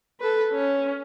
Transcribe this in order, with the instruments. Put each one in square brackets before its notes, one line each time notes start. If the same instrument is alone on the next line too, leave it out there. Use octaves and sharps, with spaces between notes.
[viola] A4 B4
C#4